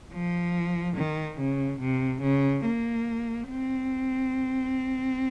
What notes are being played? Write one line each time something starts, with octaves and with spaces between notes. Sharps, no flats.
F3
D#3
C#3
C3
C#3
A#3
C4